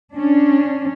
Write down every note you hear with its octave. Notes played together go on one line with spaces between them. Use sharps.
C#4 D4